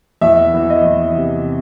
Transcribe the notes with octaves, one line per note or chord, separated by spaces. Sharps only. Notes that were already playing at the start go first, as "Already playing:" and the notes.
E2 E5
E3
D#5
E2
C3